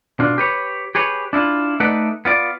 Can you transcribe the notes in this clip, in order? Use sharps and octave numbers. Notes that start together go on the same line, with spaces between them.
B2 D4 F4
G4 B4 C#5
G4 G#4 B4 C#5
D4 E4 F4
A3 D#4 B4 D5 E5 F#5
B3 F4 D5